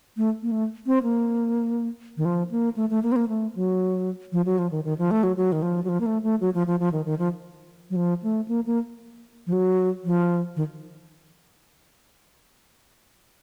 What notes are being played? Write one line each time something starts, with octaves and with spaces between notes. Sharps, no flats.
A3
A#3
A3
C4
A#3
D#3
F3
A#3
A3
A3
A#3
C4
A#3
A3
F#3
F3
F#3
F3
D#3
D#3
F3
A3
F#3
F#3
D#3
F3
F#3
F3
A#3
A3
A3
F#3
F3
F3
F3
D#3
D#3
F3
F#3
F3
A3
A#3
A#3
F3
F#3
F3
D#3